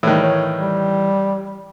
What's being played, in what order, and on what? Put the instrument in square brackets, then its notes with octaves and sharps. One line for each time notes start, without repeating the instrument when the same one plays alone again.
[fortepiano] A2 D#3 [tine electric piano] E3 [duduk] G3
[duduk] C#5
G3